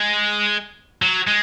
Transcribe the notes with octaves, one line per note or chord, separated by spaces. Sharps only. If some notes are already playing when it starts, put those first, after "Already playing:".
Already playing: G#3
F#3
G#3